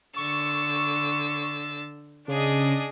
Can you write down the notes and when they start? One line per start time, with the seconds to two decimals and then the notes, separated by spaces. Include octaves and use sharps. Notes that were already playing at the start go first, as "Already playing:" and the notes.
0.16 D3 C#6 E6 A6
2.28 C#3 D4 G#4 D#5